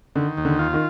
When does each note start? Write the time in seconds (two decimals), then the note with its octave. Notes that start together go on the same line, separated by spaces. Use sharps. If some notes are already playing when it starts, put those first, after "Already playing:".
0.15 D3 D#3
0.37 D#2
0.45 D3
0.59 F4
0.74 D#3